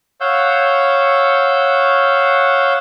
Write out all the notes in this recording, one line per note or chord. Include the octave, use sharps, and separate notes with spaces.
C#5 F5 F#5 E6 G6